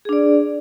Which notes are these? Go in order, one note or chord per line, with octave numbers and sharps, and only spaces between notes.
D4 G#4 D5